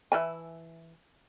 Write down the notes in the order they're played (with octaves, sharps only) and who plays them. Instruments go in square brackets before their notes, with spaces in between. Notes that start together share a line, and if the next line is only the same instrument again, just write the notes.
[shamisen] E3 E4 G#5